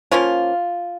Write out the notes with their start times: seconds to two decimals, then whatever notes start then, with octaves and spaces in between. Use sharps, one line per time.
0.11 F3 A#3 C#4 F4